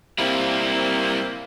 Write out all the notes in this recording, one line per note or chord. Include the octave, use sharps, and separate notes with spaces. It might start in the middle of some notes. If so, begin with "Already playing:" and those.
G3 A#3 C4 E4